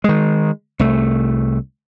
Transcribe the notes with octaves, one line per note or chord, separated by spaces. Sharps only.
D#3 G#3
C2 A3